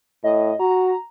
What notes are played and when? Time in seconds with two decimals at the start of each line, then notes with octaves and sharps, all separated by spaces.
0.24 A2 D#5
0.60 F#4 A#5